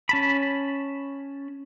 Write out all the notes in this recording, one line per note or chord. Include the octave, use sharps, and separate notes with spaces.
C#4 A5 B5